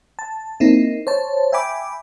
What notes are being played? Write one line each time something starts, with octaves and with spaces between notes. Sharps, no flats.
A5
A#3 C4 D#4 E4
C5 C#5 A5
E5 G5 G#5 B5 D6